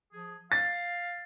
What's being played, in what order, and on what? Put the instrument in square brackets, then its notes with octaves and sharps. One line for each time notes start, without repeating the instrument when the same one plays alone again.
[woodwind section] F3 G#4
[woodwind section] F5 [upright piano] A6